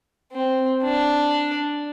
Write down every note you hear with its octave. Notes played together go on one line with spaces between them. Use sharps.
C4
D4